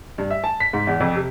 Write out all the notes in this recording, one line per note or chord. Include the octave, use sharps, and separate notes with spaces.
G2
E5
A5
B6
G#2
E2
F2
C3